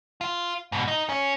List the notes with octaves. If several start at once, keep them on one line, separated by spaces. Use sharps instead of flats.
F4
G#2 B2
D#4
C#4